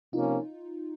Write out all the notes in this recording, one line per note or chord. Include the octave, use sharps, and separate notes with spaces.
C3 F3 A#3 C#4 D#4 F4